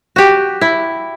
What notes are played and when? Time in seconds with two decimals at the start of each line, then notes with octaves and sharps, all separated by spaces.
0.16 F#4 G4
0.61 E4